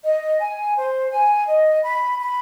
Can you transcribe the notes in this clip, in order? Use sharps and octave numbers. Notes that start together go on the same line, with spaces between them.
D#5
G#5
C5
G#5
D#5
B5
B5